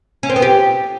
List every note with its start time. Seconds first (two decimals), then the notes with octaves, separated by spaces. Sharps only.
0.23 C#4
0.30 C4
0.36 B3
0.42 G4